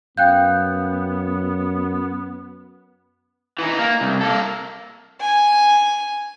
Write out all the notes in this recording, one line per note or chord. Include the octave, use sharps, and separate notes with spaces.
F#2 B3 F5 G5 F#6 G6
E3 D#4
A#3
C2
A#3 A4
G#5